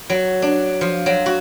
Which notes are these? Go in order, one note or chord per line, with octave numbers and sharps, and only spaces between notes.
F#3
D4
F3
F#3
F#4